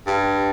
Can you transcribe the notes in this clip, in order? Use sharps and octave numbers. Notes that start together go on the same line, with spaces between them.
G2